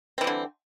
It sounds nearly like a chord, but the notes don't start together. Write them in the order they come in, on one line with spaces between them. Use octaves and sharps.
C4 E3 G3 D3